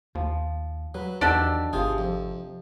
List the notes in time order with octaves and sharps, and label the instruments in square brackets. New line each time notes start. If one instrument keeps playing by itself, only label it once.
[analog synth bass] D#2 [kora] F3
[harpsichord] F#3 [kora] B4
[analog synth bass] E2 [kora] D#3 F#3 [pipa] D4 G4 A4 [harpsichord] D5
[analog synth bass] G#1 [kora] C3 F3 [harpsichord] F4 G#4
[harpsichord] F2